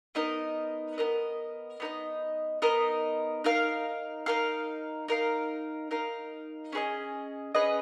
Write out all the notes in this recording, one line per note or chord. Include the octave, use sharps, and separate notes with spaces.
B3 D#4 A#4 D#5
B3 D#4 A#4 D#5
B3 D#4 A#4 D#5
B3 D#4 A#4 D#5
D#4 A#4 F5
D#4 A#4 F5
D#4 A#4 F5
D#4 A#4 F5
C#4 G#4 B4 D#5
C#4 G#4 B4 D#5